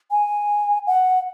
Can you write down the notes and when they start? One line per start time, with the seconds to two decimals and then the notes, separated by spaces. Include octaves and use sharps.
0.11 G#5
0.87 F#5